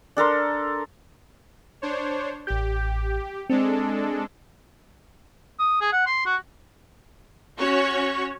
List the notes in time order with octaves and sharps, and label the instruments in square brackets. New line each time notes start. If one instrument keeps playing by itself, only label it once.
[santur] D4 A4 A#4 C6
[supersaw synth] D4 C5 C#5
[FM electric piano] A1 G6 [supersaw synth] G4
[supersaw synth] G#3 D4 A4 [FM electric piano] C4
[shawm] D#6
G#4
F#5
C6
F#4
[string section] C#4 F#4 C#5 C#6